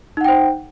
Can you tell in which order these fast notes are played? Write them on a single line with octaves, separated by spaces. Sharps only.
D#4 F#5 G5 C5